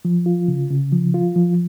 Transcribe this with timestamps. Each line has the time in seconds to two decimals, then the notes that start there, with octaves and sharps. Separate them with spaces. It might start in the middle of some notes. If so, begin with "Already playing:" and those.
0.05 F3
0.26 F4
0.48 C#3
0.70 C#3
0.92 F3
1.14 F4
1.36 F3